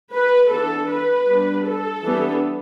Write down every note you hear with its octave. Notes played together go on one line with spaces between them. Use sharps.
B4
E3 B3 D4 A4
B4
G3 B3 D4
A4
E3 G3 B3 D4